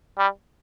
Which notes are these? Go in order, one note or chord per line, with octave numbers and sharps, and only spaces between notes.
G3